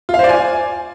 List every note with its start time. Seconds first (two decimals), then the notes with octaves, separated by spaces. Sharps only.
0.09 F4
0.14 F5
0.19 C5
0.24 D5
0.29 G#5